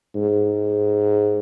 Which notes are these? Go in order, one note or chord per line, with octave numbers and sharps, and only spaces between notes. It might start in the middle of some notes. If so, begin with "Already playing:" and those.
G#2